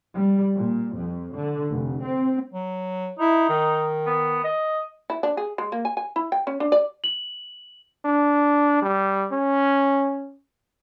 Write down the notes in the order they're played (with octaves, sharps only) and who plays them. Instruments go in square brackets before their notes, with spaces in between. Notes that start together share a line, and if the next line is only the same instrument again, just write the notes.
[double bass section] G3
A#2
F2
D3
F1
C4
[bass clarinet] F#3
[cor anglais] D#4 [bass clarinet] E4
[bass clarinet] D#3
[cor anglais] B3
D#5
[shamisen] E4
D4
G#4
G#3
A#3
G#5
G#5
E4
G5
C#4
D4
D5
[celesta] F#7
[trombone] D4
G3
C#4